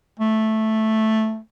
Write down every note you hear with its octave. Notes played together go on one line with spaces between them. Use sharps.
A3